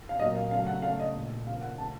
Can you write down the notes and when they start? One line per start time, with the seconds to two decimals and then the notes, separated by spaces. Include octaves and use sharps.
0.09 F5
0.19 A#2 F#3 A#3 D#5
0.35 F5
0.51 C#3 F#3 A3 F5
0.67 F#5
0.82 C#3 A3 F5
0.99 D#5
1.15 A#2 A3
1.46 C#3 F3 A#3 F5
1.61 F#5
1.78 C#3 F3 A3 A5